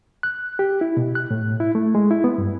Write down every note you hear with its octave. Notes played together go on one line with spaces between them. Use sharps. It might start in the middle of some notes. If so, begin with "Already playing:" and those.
F#6
G4
E4
B2
F#6
A2
E4
A3
G#3
E4
B3
G2